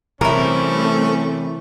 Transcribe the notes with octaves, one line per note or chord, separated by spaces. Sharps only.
C3 E3 G3 A3 C4 C#4 E4 A#4